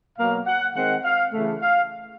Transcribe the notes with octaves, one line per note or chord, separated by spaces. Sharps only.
B2 F#3 A#3 F5
F#5
D#3 G#3 C4 F#5
F5
C#3 E3 A3
F5